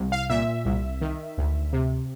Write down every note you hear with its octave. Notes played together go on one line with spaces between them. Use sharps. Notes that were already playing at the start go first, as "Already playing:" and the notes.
Already playing: C2
F5
A#2 E5
C2
D#3
D2
C3